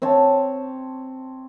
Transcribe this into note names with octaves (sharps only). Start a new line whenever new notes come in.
C4 C#5 A5